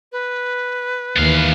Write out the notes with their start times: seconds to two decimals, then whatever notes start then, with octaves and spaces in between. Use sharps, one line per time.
0.12 B4
1.16 D#2 E3 B3 F5